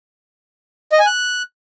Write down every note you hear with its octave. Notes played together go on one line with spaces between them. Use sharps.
D#5
G#5
F#6